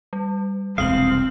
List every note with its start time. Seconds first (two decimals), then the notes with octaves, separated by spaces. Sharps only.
0.13 G3
0.78 E1 C2 G#3 C4 F5 D#6 F#7